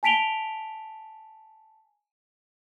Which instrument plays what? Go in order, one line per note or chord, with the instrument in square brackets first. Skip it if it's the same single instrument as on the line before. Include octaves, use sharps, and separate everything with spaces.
[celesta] G#5 A5 B6 D7 F7 G7